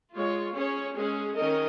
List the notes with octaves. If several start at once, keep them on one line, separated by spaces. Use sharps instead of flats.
G#3 F4 C#5
C#4 G#4 C#5
G#3 C#4 G#4
D#3 C#4 A#4 D#5